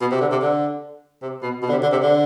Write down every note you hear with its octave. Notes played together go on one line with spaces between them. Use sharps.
B2
C3
D3
C3
D3
C3
B2
B2
D3
C3
D3
C3
D3